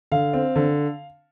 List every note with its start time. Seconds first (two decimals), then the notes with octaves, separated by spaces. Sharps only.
0.12 D3 F5
0.33 C4
0.56 D3